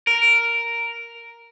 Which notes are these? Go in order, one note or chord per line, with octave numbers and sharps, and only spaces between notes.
A#4